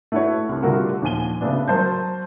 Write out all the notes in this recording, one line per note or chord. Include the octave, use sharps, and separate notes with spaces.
A3 E4 F#4 B4 C#5
C2 C3
D3 G3 A3 F4 F#4 A#4
D#2 A#2 F3 G#5 D#7 G7
C#3 A3 B3 D4
F#3 A#4 C5 A5 C6 G6